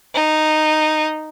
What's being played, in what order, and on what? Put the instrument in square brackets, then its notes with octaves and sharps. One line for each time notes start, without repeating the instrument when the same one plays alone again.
[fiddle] D#4